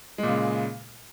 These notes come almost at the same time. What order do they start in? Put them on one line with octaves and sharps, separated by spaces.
G#3 A#2 C#3